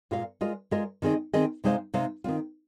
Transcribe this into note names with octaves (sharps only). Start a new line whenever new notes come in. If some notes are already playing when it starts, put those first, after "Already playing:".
A#2 G#3 F4 A#4 F5
G#3 F4 A#4 D#5
G#3 F4 A#4 D#5
D#3 C4 G#4 D#5
D#3 C4 G#4 D#5
C3 G#3 D#4 C5 F5
C3 G#3 D#4 C5 F5
D#3 C4 F4